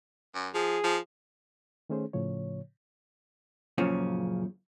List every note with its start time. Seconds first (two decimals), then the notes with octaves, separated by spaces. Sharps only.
0.35 F#2
0.54 F3 G#4
0.84 F3
1.89 D#3 A3 C#4 G#4 C5
2.13 A2 C#3 F3 C#5
3.78 F#2 A#2 C#3 F3 C#4